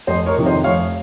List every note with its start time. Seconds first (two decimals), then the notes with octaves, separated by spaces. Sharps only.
0.07 F1 C5 D#5
0.26 A#4 C#5
0.36 F2 C3 D#3
0.45 C5 D#5
0.64 F1 C#5 F5